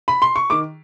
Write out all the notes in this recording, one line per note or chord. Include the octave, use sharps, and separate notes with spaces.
B5
C6
C#6
D#3 D6